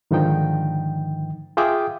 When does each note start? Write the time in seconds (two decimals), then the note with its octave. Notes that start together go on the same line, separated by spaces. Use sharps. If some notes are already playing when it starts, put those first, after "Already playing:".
0.11 G#2 D3 D#3 F3 D#4 G5
1.57 F4 G#4 E5 G5 D6 D#6